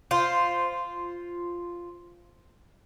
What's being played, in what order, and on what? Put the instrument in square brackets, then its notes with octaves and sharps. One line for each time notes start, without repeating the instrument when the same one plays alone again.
[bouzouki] F4 C5